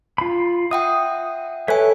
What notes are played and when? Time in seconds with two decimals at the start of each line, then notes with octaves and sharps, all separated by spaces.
0.18 F4 B5
0.71 E5 F#5 G5 D#6
1.68 A4 B4 C#5 E5 G#5